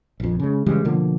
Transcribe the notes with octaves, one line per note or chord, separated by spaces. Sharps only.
A#1 F2
C#3 G#3
C#3 E3 G3 G#3
B2 D3 F3 A#3